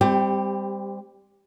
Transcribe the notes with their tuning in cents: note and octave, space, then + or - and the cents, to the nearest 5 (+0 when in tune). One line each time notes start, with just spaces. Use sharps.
G3 +25 C4 -10 G4 +0